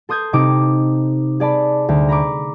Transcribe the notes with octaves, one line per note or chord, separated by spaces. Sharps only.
A4 C6 D#6 G6 G#6
C3 D#4 D6
G#4 D5 A5 B5
D2
A#5 B5 C#6 D6